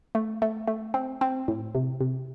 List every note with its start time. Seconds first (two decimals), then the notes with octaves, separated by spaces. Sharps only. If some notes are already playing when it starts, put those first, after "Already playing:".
0.15 A3
0.42 A3
0.68 A3
0.94 C4
1.21 C4
1.48 A2
1.75 C3
2.01 C3